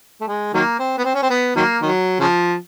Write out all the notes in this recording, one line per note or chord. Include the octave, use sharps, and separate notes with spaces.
A3
G#3
D#3 F#3 A#3
C4
B3
C4
C#4
C4
B3
D#3 F#3 A#3
D#3 F#3
C#3 F3